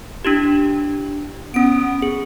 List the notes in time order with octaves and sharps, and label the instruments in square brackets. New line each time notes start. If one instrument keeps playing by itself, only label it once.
[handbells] D4 E4 G4
[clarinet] B3 [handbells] C#4 D7
[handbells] G#4